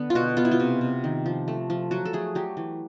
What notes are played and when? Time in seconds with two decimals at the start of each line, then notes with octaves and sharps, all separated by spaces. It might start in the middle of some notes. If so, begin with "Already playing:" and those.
Already playing: D3 B3
0.10 F4
0.15 B2 F#4
0.37 B3 F4
0.45 E4
0.51 F4
0.60 C3
0.81 C3
1.04 D#3
1.26 F3
1.48 A3
1.70 F3
1.91 F#3 F#4
2.05 A4
2.13 A3 G#4
2.35 F#3 G4
2.57 E3